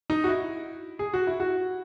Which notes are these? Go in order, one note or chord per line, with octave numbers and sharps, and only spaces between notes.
D#4
F#4
E4
G#4
F#4
E4
F#4